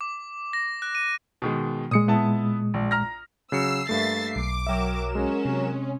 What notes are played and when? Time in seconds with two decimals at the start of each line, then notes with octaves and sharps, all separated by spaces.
0.01 D6
0.53 A#6
0.82 F#6
0.95 D#7
1.42 B2 D#3 G#3
1.91 A#2 G#3 D#6 C#7
2.08 B3 E4 A5
2.74 A#1
2.91 A#5 F6 A#6
3.52 C#3 F#3 E6 C7 C#7
3.89 G2 A3 A#3 E5 A6
4.36 B1 D6
4.67 F#3 A#4 E5 G5 E7
5.15 G#3 C#4
5.45 C3